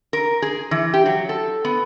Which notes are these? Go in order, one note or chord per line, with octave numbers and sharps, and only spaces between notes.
A#4
G#4
E3
G4
F#3
A4
B3